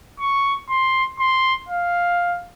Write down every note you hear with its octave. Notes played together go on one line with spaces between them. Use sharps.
C#6
C6
C6
F5